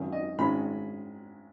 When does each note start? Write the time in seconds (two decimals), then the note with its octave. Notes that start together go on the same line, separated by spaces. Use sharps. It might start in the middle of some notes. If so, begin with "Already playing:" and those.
Already playing: G#1 F#2 D#3
0.12 D#5
0.38 G#1 G#2 G#3 C#4 B5